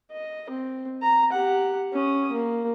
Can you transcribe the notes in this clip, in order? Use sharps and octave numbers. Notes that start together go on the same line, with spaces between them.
D#5
C4
A#5
G4 F#5
C#4 D#6
A#3